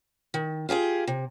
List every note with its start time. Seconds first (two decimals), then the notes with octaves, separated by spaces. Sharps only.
0.34 D#3
0.69 F4 G4 G#4 F5
1.07 C3